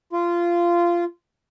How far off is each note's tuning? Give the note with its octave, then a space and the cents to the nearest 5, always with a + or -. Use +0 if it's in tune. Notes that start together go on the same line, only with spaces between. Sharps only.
F4 -15